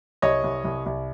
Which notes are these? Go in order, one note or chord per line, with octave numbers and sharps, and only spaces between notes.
C2 C#5 D#5
C2
C2
C2